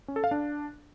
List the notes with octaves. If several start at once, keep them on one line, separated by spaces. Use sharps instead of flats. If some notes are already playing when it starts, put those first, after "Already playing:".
C#4
A4
F5
D4